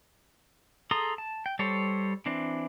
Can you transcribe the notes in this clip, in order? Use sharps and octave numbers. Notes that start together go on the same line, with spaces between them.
G#4 A4 A#5 C6 D#6
A5
G5
G3 A4 C5 C#5
E3 C4 D4